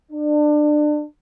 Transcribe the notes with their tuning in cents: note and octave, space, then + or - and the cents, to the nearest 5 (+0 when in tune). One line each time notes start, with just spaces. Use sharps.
D4 +25